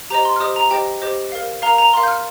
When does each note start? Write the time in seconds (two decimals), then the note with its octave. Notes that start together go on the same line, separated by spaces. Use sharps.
0.10 G4 C5 D#5 A#5
0.25 C6
0.36 F6
0.40 G4 C5 D#5 D#6
0.56 A#5
0.71 G4 C5 D#5 G5
1.02 G4 C5 D#5
1.32 A#4 F5
1.62 A#4 F5 A#5
1.78 A#5
1.93 A#4 F5 C6
2.03 G6
2.08 F6